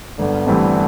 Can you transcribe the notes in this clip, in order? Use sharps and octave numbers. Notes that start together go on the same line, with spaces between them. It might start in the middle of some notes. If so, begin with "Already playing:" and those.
G1 D3
G2 E3 A3 C4